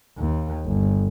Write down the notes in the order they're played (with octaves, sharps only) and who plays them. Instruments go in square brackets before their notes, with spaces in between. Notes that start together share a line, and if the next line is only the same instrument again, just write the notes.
[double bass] D#2
G1